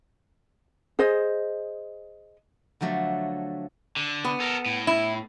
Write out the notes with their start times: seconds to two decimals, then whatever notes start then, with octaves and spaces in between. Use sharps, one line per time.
0.99 G#4 C5 D#5
2.81 D3 F3 F#3 A3
3.96 D3
4.25 B3
4.40 A4 A#4
4.66 A2
4.87 E4